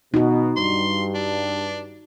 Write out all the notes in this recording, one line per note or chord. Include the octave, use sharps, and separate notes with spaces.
B2 D#4 F#4
G2 C6
D4